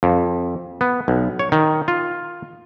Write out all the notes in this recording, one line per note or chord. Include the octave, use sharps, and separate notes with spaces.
F2
B3
B1
C#5
D#3
F4